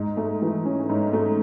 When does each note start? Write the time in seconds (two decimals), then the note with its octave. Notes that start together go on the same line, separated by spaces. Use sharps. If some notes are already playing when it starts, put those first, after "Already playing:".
Already playing: G#2
0.17 A3
0.42 E3
0.65 C#4
0.89 G#2
1.13 A3